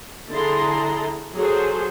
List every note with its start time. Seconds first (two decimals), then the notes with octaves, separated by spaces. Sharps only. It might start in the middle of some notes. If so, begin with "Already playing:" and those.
0.30 D3 E4 G#4 A5 A#5 C6
1.34 F#3 G#4 A4 C5